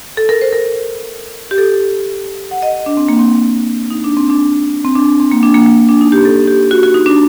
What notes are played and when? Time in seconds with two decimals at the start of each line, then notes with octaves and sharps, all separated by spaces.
0.17 A4
0.29 A#4
0.41 C5
0.53 A#4
1.51 G4
1.58 A4
2.51 F#5
2.62 D#5
2.86 D4
2.97 C4
3.08 A#3
3.19 C4
3.90 D#4
4.04 D4
4.17 C4
4.30 D4
4.85 C4
4.95 D4
5.20 C4
5.31 A#3
5.43 D4
5.54 A#3
5.66 A#3
5.89 D4
6.01 D#4
6.12 G4
6.25 A4
6.47 G4
6.71 F#4
6.83 F#4
6.94 D#4
7.06 D4